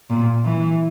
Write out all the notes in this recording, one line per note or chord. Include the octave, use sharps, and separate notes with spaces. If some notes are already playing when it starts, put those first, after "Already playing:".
A#2
E3